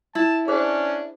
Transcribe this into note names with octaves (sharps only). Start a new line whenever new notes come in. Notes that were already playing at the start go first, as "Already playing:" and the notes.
E4 A5
C#4 D4 G#4 C5